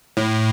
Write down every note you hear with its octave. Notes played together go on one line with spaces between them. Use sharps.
A2